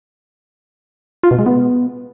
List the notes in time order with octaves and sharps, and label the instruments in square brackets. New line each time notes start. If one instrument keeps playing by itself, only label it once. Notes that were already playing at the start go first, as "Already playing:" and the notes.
[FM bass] F4
B2
G#3
B3